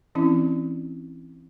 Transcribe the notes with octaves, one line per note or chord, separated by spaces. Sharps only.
E3 C4 C#4 E4